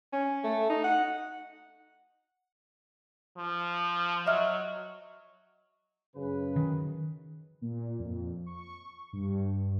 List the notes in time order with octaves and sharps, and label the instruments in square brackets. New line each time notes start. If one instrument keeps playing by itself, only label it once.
[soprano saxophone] C#4
A3
D#4
F#5
[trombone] F3
[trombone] F#3 [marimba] D#5 E5 F6
[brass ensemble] F#2 C#3 B4
[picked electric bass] D#3
[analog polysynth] A#2
F2
C#6
G2